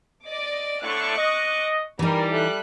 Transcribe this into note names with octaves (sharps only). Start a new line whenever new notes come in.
D5 D#5 D6
A2 D3 A3 C#6 D6 F#6
D#5
E3 G3 D#4 A#4
A4 E5 F#6